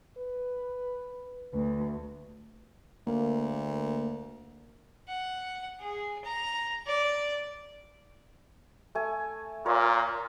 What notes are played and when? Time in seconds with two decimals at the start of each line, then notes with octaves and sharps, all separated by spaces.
0.18 B4
1.53 D2 B4
3.07 D2 A#3
5.08 F#5
5.81 G#4
6.25 A#5
6.87 D5
8.95 A3 G#5
9.66 A#2 F4 A#4 C#5